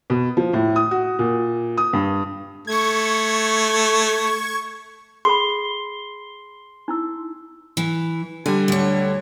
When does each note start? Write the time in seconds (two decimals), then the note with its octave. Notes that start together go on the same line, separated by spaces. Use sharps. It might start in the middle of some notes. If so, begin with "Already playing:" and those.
0.10 B2
0.37 F3
0.53 A2
0.76 D#6
0.91 F#4
1.19 A#2
1.77 D#6
1.93 G2
2.67 A3 C#6 G#6
5.25 G#4 A4 B5 C6
6.88 D#4 E4 E6
7.77 E3
8.46 D3 G3 G#5
8.68 D2 C#5